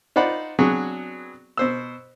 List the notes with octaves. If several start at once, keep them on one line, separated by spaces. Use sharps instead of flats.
D#4 F4 C5 D5 F#5 B5
F#3 B3 C4 D4 F#4 G#4
B2 C5 E6